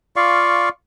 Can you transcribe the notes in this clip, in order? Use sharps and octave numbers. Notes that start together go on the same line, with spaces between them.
F4 D5 F5 C#6